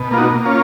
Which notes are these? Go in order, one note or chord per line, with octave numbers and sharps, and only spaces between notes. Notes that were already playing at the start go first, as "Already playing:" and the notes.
Already playing: B2
A#3 F4
D#4 F#4
A#3
C#4 F4